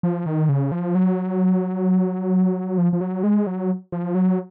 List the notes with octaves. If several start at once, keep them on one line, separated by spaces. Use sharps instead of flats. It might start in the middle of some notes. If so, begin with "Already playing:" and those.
F3
D#3
C#3
F3
F#3
F3
F3
F#3
G#3
F#3
F3
F#3